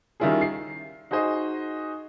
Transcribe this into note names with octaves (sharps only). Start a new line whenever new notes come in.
D#3 G3 C#4 E4 F4 G#4
C7
D#4 F#4 G#4 C5 D#5